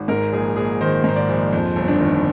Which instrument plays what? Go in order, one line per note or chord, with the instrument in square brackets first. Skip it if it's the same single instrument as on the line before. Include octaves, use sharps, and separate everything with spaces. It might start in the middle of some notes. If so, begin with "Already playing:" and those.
Already playing: [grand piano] G#1
G#2 A#4
A#1 G#4
A#1 G#4
D#3 C5
G#2 C5
D5
A#1
F2 C5
G1
D4
D#3